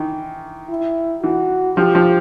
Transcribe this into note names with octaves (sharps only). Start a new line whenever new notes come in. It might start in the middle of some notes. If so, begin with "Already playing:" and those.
Already playing: D#3 E3
E4
E3 F#4
F3 G4
F3